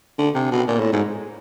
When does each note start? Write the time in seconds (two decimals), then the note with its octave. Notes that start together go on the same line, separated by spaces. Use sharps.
0.18 D3
0.35 C3
0.51 B2
0.68 A#2
0.80 A2
0.92 G#2